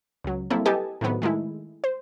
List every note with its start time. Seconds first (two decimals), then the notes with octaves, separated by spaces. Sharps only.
0.24 C#2 F#3
0.50 F#3 G3 A#3 C4 E4 A4
0.66 G4 A4 B4 D#5 G#5 A5
1.01 A2 C3 D#3 F#3 B3
1.22 D#3 G#3 A3 E4
1.84 C5